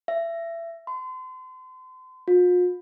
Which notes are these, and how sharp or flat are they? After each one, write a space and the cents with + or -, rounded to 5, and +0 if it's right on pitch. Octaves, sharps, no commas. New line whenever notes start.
E5 +25
C6 -35
F4 +45